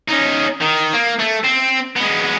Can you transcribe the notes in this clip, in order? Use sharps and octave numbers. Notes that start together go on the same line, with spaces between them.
C#4 D#4
D#3
A#3
A3
C4
G#3 B3